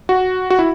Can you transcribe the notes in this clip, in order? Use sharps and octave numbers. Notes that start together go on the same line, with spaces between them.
F#4
F#4
E4